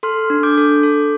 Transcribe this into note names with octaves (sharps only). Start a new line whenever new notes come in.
A4 C6 F6
D4
D6 G6
A4
A4